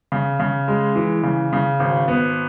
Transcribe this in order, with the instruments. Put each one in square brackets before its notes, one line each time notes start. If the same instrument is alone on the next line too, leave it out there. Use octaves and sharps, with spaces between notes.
[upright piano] C#3
C#3
G#3
E3
C#3
C#3
G#1
B3